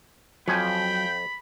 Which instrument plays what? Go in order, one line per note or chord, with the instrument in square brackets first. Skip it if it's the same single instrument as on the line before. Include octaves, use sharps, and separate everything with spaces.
[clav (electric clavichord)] F2 F3 G#5 [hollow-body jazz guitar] F#3 [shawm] G5 [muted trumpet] B5